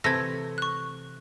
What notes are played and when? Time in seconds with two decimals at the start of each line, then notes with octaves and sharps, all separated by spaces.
0.04 C3 E3 A3 G#6 A#6
0.58 C#6 F#6